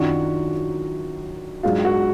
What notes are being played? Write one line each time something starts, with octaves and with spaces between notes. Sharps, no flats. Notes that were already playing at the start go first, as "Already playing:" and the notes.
Already playing: F#2 D#3 F#3 D4 F4 F#4
G#2 F#3 D4 F4 G#4
F#4